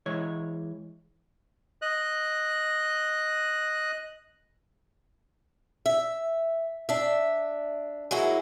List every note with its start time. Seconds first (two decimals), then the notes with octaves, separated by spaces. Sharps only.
0.06 E3 G#3 C#5
1.82 D#5 F#6
5.86 E5
6.89 D4 E5
8.11 F#3 G#3 A#3 E4 F#4